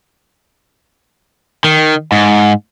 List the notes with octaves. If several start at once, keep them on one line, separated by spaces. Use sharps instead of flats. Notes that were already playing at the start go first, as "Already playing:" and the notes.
D#3
G#2